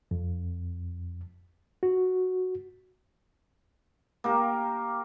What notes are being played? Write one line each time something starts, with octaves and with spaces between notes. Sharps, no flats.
F2
F#4
A#3 G4 A#4